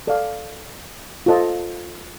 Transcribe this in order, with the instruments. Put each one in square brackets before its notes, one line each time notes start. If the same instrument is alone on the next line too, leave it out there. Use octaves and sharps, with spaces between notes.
[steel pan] A4 D5 F5
F4 A4 C5 D#5 A5